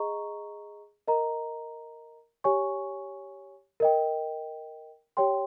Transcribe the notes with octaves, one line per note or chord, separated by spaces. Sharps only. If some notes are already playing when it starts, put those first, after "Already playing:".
Already playing: G#4 D#5 A#5 C#6
A#4 D#5 A#5
G4 C#5 G#5 C#6
A#4 D#5 G5
G4 C#5 G5 C6